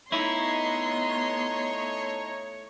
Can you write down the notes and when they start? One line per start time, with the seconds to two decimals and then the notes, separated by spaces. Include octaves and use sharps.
0.12 A3 B3 D#4 E4 C#5 D#5 A#5 C6